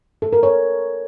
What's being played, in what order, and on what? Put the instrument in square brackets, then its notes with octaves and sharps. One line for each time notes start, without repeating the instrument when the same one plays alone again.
[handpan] A4
A#4
C#5